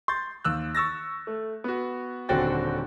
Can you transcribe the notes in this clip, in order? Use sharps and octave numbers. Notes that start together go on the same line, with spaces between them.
C6 G6 A6
D#2 E6 F#6
C#6 E6 A6 A#6
A3
B3 F#4
D#1 D3 C4 F#4 G5 A6